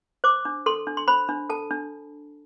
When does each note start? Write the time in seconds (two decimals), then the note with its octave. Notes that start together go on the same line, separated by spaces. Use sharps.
0.24 C5 D6
0.45 D4
0.66 A4 C6
0.87 D4
0.97 C6
1.08 C5 B5
1.29 D4
1.50 A4 A5
1.71 D4